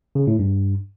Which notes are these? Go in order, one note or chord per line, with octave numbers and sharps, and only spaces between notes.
C#3
A2
G2